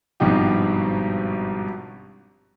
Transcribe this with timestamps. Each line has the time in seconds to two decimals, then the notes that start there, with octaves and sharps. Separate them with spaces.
0.20 G#1 G2 B2 F3 D#4 G4